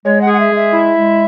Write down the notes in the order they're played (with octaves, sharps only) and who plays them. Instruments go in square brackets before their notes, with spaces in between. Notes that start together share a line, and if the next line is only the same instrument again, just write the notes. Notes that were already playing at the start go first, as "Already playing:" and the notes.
[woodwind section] G#3 [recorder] C#5
[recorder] F#5
[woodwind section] G#4
[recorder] F#5
E5
[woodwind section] G#3
[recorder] E5
[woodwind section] E4
G#3